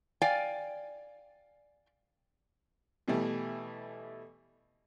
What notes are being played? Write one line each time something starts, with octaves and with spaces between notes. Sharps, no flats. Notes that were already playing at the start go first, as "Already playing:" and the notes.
D5 F5 G5 G#5
B2 E3 G3 A3